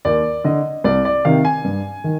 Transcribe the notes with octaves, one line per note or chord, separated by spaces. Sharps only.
D#2 D5
D3 D#5
C2 D5
D5
C3 D#3 F5
G#5
G2
D#3